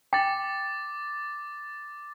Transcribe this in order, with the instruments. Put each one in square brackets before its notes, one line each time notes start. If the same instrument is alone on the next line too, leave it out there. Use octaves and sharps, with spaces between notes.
[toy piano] G5 [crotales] D6 A6